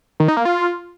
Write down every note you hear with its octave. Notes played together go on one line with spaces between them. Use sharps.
D#3
D#4
A#3
F4